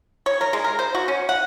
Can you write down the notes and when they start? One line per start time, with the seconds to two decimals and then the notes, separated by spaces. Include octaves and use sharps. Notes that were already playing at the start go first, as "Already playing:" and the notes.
0.26 C#5
0.41 A#4
0.53 G#3
0.64 A#4
0.79 C5
0.95 F#4
1.08 C#4
1.29 F#5